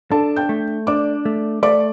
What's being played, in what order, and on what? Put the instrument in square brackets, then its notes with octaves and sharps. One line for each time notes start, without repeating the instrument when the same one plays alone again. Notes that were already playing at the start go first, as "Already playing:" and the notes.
[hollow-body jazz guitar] D4 [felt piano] A4 A5
[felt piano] G5 G6
[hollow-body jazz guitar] A3
[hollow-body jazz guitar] D4 [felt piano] D5 D6
[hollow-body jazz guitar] A3
[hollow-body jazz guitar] A3 [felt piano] D5 D6